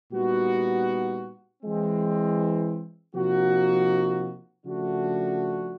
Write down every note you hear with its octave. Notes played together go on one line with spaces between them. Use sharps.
A#2 G3 B3 D#4 F#4
E3 G#3 C4
C3 F3 A#3 D#4 F#4
C#3 F3 A3 D4 F#4